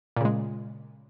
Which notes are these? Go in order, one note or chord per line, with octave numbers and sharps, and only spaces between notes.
A#2 C#3 G#3